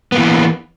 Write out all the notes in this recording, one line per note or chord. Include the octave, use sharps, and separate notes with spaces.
E3 A#3 B3